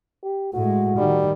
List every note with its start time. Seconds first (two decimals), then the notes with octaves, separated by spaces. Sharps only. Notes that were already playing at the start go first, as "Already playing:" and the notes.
0.23 G4
0.54 A2 G#3 F#4
0.98 D#3 G3